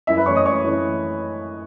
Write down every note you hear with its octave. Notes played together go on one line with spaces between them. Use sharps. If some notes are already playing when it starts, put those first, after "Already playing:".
F#2 E4 E5
B4 B5
E3 A3 C#4 C#5 C#6
D#5 D#6
F#2 C#5 C#6
E3 A3 C#4